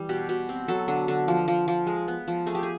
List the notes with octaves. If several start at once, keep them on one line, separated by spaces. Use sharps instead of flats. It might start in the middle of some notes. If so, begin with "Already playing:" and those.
Already playing: E3 G3
B2 G4
B2
C4
F#3 A4
D3
D3
F3
F3
F3
G#3
B3
F3
A3 G#4
G4
G#4